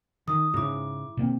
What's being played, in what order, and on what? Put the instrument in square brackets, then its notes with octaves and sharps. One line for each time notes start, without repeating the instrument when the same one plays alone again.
[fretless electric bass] D#3 [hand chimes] D#6
[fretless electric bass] G#2 C#3 [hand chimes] E4 D6
[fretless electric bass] B2 A#3 C4